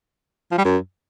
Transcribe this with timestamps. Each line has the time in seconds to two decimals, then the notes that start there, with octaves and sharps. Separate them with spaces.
0.51 F3
0.58 G3
0.65 F#2